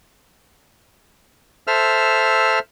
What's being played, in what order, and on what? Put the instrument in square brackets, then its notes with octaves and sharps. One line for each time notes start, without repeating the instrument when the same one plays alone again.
[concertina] A4 C5 E5 E6 F6